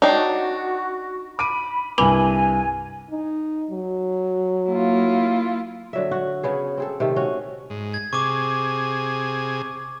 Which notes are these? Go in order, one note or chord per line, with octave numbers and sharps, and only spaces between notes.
D4 D#4 F#4 C#5 D5 G5
B5 D6 D7 D#7
C2 G2 B4 G#5 B5 D6
D#4
F#3
A#3 E4 F4
D3 F#3 E5
F#4
C#3 B3 G#4
C4 G#4 A4
C3 D#3 A3
C#4 F#4
G#2
G#6
C3 G#4 C#6 D6